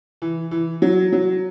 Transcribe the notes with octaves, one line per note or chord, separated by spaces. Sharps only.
E3
E3
F#3
F#3